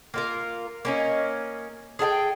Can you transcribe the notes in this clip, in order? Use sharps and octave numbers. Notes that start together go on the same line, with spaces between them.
A#3 F4 A#4
A#3 C#4 D#4
G#4 A4 F5 G5